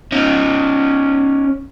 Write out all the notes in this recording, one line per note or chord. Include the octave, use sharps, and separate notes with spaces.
C#4 D#4